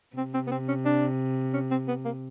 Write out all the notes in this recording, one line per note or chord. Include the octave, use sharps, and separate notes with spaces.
C3 C4
C4
B3
C4
C#4
D4
C#4
C4
B3
A#3